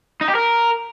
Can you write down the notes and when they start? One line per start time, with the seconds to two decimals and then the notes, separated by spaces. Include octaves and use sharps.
0.21 D#4
0.28 G4
0.35 A#4